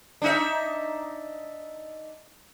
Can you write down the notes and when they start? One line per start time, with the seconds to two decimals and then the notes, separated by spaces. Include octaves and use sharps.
0.22 D4 D#4 E5